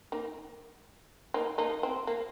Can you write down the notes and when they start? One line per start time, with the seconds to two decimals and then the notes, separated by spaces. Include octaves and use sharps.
0.12 A#3 D#4
1.34 A#3 D#4
1.58 A#3 D#4
1.83 C4
2.07 A#3